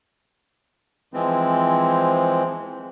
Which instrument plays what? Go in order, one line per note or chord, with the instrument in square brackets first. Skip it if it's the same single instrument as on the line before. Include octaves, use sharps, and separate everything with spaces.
[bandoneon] E3 F3 G#3 C4